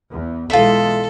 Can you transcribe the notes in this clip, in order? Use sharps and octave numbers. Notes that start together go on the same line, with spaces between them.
E2
B1 E3 G#3 F4 A4 E5